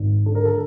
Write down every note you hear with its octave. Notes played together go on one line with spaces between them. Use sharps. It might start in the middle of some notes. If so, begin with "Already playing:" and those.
Already playing: G#1
D3 A4
A#4
A4